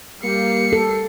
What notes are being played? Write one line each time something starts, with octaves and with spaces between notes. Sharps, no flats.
G3 A#3 C7 C#7
A4